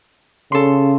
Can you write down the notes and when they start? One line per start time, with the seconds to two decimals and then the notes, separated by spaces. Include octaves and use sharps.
0.52 C#3 A4 C6